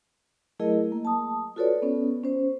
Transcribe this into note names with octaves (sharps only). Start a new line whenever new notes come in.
F#3 A3 E4 G#4 A#4 D#5
A#3
A5 D#6
F4 F#4 A4 B4 C#5 D5
B3 C#4
C#4 C5